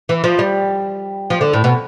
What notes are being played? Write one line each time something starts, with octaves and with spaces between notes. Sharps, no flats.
E3
F3
G3
F3
D3
A2
B2